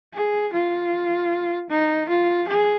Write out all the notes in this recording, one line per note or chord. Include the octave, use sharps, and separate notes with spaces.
G#4
F4
D#4
F4
G#4